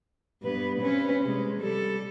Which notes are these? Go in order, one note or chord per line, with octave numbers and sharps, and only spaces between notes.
G2 B3 B4
C4 C#4 B4
C3 G#3
G3 A4